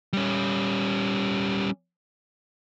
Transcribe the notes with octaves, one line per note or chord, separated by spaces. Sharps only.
G3 C#4